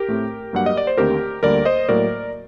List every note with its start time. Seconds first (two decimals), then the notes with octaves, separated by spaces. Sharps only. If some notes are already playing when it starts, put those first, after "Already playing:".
Already playing: G4 A#4
0.08 A2 A3 C4
0.53 G2 F#3 A#3 F#5
0.66 D#5
0.77 D5
0.87 C5
0.97 D#2 D3 A3 C4 G4 A#4
1.43 D2 D3 G3 A#3 A#4 D5
1.65 C5 D#5
1.89 A2 F#3 A#3 A#4 D5